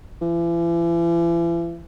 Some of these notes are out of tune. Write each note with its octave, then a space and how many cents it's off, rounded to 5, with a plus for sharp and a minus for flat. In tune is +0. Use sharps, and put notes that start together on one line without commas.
E3 +40